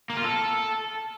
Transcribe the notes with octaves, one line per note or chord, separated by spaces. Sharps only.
A#3
F4
A4